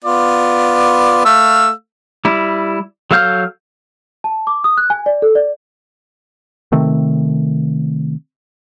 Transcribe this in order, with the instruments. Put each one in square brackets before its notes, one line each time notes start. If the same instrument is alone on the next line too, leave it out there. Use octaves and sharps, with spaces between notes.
[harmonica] B3 F4 D5
A3 F5 E6
[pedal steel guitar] G3 E4
F#3 A4 F5 F6 G6
[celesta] A5
D6
D#6
F#6
G#5
D5
A4
D5
[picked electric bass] C3 D#3 A3 C4